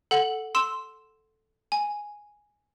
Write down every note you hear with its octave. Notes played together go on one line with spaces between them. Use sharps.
A4 F#5 F#7
C6 E6 E7
G#5